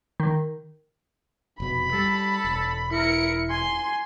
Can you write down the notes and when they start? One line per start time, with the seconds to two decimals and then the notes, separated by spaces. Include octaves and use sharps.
0.20 D#3
1.60 F1 B2 B5
1.93 G3 A4
2.45 E1
2.92 E4 A#4 C#7
3.50 G#5 C6